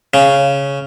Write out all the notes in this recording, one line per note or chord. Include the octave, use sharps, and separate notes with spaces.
C#3